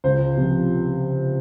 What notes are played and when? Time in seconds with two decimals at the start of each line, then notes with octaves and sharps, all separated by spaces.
0.04 C#2 C5
0.37 C3 F3